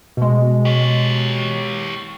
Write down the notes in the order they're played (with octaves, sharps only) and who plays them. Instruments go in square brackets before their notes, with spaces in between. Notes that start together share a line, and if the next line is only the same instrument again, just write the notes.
[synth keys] B2 G#3
[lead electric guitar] G4 C#5